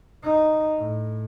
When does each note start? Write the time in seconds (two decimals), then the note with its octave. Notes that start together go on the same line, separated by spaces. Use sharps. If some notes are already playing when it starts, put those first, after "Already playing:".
0.23 D#4
0.78 A2